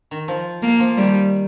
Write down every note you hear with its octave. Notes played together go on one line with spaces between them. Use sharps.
D#3
F3
A#3
F3
D#3 G3